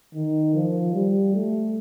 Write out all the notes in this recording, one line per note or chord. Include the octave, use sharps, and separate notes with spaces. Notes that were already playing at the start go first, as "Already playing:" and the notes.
D#3
F3
G3
A3